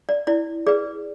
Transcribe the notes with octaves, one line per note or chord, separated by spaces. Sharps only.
D5
E4 D5
G#4 B4 D5